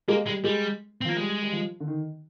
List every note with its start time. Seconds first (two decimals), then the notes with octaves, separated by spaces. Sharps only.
0.08 G#3 A#3
0.26 G3 G#3
0.44 G3 G#3
1.01 C4
1.05 F3 A#3
1.16 G3 G#3
1.42 G3
1.52 F3
1.80 D3
1.88 D#3